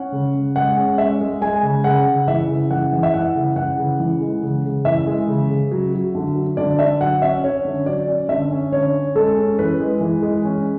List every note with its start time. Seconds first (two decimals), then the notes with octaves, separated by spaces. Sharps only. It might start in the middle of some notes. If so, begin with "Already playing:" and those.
Already playing: C#4 F#5
0.12 C#3
0.34 C#3
0.56 G#3 F#5
0.77 C#4
0.98 G#3 E5
1.21 G#3
1.42 G#3 G#5
1.63 C#3
1.84 C#3 F#5
2.06 C#3
2.27 E3 E5
2.49 C#3
2.71 E3 F#5
2.92 E3
3.03 E5
3.14 E3 F#5
3.35 C#3
3.56 E3 F#5
3.78 C#3
4.00 E3
4.21 G#3
4.43 C#3
4.65 C#3
4.85 E3 E5
5.07 G#3
5.28 C#3
5.50 C#3
5.72 F#3
5.94 F#3
6.15 D3
6.36 F#3
6.57 D3 D5
6.79 D3 E5
7.00 F#3 F#5
7.22 C#4 E5
7.44 C#4 C#5
7.65 D3
7.86 F#3 D5
8.08 C#4
8.29 D3 E5
8.51 C#4
8.72 D3 C#5
8.93 C#4
9.15 G#3 A4
9.36 C#4
9.59 E3 B4
9.80 G#3
10.01 E3
10.22 G#3
10.45 C#4